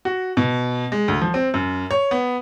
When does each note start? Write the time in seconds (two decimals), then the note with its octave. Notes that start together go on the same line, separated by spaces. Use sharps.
0.05 F#4
0.37 B2
0.92 G#3
1.08 D2
1.22 F3
1.34 C4
1.54 F#2
1.91 C#5
2.11 B3